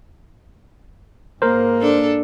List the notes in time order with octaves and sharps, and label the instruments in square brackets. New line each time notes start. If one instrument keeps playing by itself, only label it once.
[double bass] G#2 A#3 [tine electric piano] A#4 C5
[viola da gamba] D4 A4